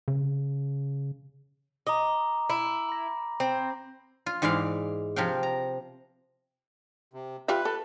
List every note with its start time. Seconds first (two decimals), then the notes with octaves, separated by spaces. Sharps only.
0.08 C#3
1.87 D#5 A#5 D6
2.49 E4
2.89 B5 A#6
3.40 C4
4.26 F4
4.42 G#2 E3 G#3 D5 F5
5.16 C3 F3 F5 G5
5.43 A#5
7.13 C3
7.48 F4 G4 B4 E5
7.65 A4